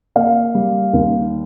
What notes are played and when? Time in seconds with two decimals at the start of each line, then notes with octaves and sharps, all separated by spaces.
0.16 A#3 F5
0.55 G3
0.93 D#2